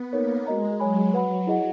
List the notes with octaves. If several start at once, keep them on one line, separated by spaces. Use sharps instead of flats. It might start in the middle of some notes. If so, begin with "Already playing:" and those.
Already playing: B3
A#3 D#4 A#4 C#5
G#3 F#4 A#4 D#5 A#5
F#3 C#5 G#5 B5
F#3 B4 F#5 B5
E4 G#4 D#5 F#5